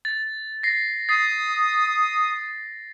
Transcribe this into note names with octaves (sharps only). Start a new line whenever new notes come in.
A6
A#6 C7
D#6 A6 C7